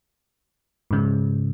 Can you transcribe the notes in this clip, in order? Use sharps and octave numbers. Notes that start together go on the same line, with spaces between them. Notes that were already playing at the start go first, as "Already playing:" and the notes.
G#2 C#3